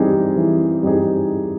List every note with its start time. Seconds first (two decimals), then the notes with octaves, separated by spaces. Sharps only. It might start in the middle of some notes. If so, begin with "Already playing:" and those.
Already playing: E3 G3 C4 D#4 G#4
0.36 E3
0.83 G3 C4 D#4 G#4